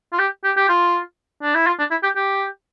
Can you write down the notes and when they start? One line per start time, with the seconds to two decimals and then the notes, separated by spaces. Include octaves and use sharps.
0.13 F4
0.19 G4
0.44 G4
0.57 G4
0.69 F4
1.42 D4
1.55 E4
1.67 F4
1.79 D4
1.91 E4
2.03 G4
2.16 G4